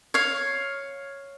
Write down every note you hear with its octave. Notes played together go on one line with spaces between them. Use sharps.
C#5 F5